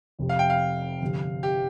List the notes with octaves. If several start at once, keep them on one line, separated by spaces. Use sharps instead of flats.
F1 F2 C3
F5
G5
F5
G1 F2 C3
G4